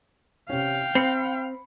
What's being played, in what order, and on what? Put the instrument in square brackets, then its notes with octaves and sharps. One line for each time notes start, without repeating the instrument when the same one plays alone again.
[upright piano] C3 C#4 [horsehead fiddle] F5 G5
[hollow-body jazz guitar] C4 [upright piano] B5 C7 C#7